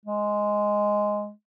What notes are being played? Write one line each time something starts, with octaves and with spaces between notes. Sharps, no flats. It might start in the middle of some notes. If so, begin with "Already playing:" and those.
G#3